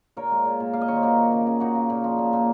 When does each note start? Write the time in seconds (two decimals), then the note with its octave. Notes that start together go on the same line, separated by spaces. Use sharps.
0.17 A#2 A#4 C#5
0.31 G#3
0.45 A#2
0.60 A#2
0.73 A#3 F5
0.81 D#5
0.88 D#3 C#5
0.96 C5
1.03 A#3 F#4 A#4
1.17 A#3
1.32 C#3
1.47 C#3
1.60 A#3 D#4 F#4
1.75 C#3
1.90 A#2
2.04 F3
2.18 A#2
2.33 A#2